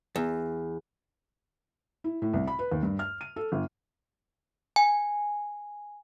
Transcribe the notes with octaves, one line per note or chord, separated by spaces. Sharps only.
E2
E4
A2
C2
B5
B4
D#2
G2
F6
D#7
A4
G1
G#5